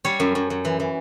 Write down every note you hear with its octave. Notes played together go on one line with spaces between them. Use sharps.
G3 C#5
F#2
F#2
F#2
E3
E3